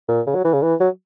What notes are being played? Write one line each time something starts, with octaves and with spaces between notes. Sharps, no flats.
A#2
C#3
F#3
E3
C#3
E3
F#3